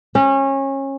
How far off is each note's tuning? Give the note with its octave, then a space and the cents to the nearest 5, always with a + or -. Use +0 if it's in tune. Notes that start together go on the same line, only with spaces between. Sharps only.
C#4 -25